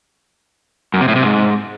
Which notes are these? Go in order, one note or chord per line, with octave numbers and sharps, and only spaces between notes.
F#2
C3
A2
C3
G#2